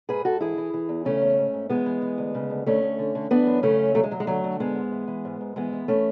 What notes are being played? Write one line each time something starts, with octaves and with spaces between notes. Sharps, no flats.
G#2 G#4 B4
G#2 F#4 A4
E3 E4 G#4
E3
E3
E2
C#3 A3 C#4
E2
G#2
G#2
E3 G#3 B3
E3
E3
D2
C#3
D2
D2 A3 C#4
D2
D3
D3
E3 B3 D4
F#2
C#3 A3 C#4
F#2
D2 F#3 A3
G#3
D2 F#3
G#3
D3 F#3 A3
D3
G#2 G#3 B3
G#2
E3
E3
G#2
G#2
E3 G#3 B3
E3
A3 C#4